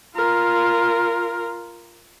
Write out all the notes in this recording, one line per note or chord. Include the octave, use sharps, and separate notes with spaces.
F4 A#4